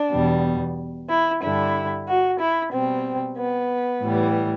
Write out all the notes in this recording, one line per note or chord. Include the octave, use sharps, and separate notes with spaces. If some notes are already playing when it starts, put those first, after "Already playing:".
Already playing: D4
E2 B2 G3
E4
G2 D3 G3 E4
F#4
E4
B2 G3 C4
B3
A2 E3 G3